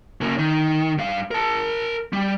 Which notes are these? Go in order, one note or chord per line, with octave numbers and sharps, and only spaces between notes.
C#3 A#3
D#3
G2 F5
A#4 A5
G3